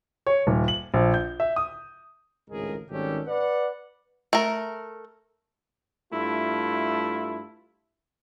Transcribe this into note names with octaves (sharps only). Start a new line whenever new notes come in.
C#5
D#1
F#7
A#1
G6
E5
D#6
G#1 C#2 A2 G#3 G#4 A#4
G#1 D#3 G3 C#4 G4 A4
B4 D5 F#5
A3 A#4
G2 A3 E4 F4